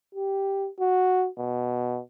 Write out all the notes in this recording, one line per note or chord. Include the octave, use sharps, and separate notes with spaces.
G4
F#4
B2